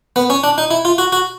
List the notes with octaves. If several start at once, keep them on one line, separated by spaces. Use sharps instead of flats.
B3
C#4
D4
D#4
E4
F4
F#4
F#4